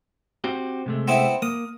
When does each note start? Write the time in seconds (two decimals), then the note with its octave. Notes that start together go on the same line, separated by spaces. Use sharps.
0.44 C4 F#4 G4
0.86 C3 G#3 A3
1.08 B3 C4 E4
1.42 A#3 D#6